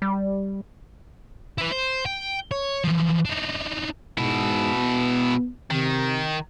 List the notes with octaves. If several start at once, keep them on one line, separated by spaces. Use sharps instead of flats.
G3
E4 B4
C5
G5
C#5
E3 F3
D4 D#4
G#2 B2 E4
B3
C3 D#3